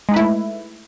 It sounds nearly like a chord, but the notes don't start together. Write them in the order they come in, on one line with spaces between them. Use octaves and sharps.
G#3 D#4 B4 E4 A3